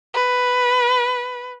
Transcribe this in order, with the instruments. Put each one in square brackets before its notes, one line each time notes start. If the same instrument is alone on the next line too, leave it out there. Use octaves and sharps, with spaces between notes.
[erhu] B4